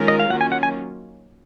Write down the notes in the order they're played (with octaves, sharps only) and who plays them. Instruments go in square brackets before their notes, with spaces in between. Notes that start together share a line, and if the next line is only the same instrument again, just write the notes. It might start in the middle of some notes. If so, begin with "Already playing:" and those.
Already playing: [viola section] D#3 G#3 C#4 F4 A#4
[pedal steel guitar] D#5
F5
[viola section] D#3 F#3 A#3 C#4 F4 [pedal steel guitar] F#5
[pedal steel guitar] G#5
F#5
G#5